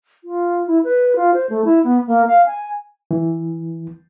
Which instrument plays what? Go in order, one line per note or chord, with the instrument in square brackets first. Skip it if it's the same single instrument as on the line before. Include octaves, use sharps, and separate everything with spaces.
[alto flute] F4
E4
B4
F4
C5
A3
E4
B3
A#3
F5
G#5
[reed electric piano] E3